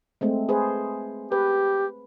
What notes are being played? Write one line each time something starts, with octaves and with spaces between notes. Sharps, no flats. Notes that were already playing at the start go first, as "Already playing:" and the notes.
G#3 A3 C4
G#4 B4 C5
G4 B4